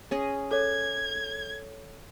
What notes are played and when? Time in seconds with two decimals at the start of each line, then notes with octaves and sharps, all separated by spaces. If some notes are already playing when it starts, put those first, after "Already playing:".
0.11 C#4 G#4 D#5
0.51 A4 C#5 G#6